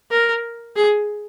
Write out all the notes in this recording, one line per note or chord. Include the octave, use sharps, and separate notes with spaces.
A#4
G#4